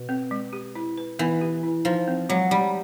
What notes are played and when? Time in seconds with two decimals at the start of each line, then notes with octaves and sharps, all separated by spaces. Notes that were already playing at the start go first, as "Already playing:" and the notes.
Already playing: B2
0.09 C4
0.31 G#3
0.53 G4
0.75 E4
0.98 B4
1.19 E3 B3
1.41 G4
1.63 E4
1.85 F3 D#4
2.08 C4
2.29 F#3 G#3
2.51 G3 G#3